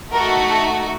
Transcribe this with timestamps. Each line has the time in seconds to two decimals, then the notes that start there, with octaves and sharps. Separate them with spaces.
0.12 A3 D#4 F#4 A4 A#4
0.50 A4